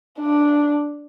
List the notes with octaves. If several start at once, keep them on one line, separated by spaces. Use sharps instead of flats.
D4